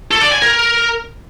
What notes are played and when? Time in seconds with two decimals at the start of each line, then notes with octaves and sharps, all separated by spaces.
0.11 A4
0.21 D5
0.32 G#5
0.42 A#4